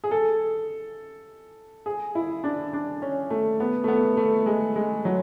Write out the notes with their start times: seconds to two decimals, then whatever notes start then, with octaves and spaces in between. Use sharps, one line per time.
0.04 G#4
0.11 A4
1.86 G#4
2.15 E4
2.44 D4
2.73 D4
3.02 C#4
3.30 A3
3.60 B3
3.84 A3
3.88 B3
4.17 A3
4.46 G#3
4.76 G#3
5.05 F#3